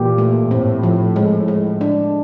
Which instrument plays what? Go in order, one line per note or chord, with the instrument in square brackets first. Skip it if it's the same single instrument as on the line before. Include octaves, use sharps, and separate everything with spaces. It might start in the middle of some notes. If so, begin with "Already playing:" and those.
Already playing: [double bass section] A#2 [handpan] E3 G4
[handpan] A3
[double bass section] A2 [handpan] C4
[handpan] F3
G#3
G#3
D4